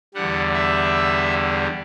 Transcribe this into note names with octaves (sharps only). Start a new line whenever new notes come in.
E2 D3 G3 F#5
E5